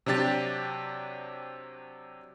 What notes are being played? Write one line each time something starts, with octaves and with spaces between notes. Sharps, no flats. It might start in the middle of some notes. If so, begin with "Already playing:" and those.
C3 F#3 D4 G4 A6